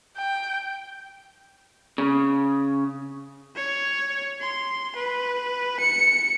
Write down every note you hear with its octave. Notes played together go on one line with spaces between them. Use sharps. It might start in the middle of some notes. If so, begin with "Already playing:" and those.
G5
C#3
C#5
C6
B4
C#7